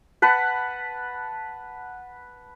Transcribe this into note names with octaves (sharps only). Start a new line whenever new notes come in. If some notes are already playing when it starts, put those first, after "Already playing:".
B4 F#5 A5 B5